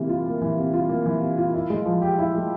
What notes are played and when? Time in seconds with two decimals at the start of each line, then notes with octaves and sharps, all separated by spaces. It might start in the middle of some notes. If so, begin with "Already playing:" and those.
Already playing: C3 E3 A#3
0.09 F4
0.25 A#3
0.41 E3
0.58 C3
0.74 F4
0.89 A#3
1.05 E3
1.22 C3
1.37 F4
1.54 E4
1.70 G#3
1.86 F3
2.02 G4
2.18 E4
2.35 G#3